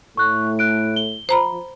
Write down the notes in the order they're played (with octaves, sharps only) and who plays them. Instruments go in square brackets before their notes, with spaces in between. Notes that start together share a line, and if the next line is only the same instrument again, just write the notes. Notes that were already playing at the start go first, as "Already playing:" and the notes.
[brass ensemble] A2 A3 [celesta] C#6 F#6
[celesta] F#6 D7
G7
[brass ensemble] F3 [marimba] C5 A#5 B5